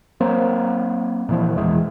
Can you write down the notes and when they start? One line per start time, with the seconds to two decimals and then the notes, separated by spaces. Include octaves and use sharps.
0.20 F#3 A#3 C4
1.29 A#2 E3 F3
1.55 E1 B2 E3 G#3